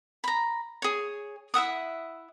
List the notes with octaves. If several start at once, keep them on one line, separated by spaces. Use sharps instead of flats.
A#5 B5
G#4 C#5
E4 E5 F#5 D#6